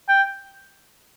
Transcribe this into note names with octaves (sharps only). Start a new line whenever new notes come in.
G5